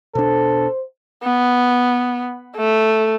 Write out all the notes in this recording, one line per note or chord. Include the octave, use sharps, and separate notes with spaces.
B2 D4 A4 C5
B3
A3